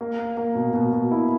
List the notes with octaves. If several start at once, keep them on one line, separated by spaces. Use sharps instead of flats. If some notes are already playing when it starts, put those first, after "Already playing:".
A#3
A#3
A#3
B2
B2
B2
E4